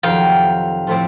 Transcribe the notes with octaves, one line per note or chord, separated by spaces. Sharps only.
F2 C3 D#3 F#3 F5 G5
A2 F3 A3 C4 F4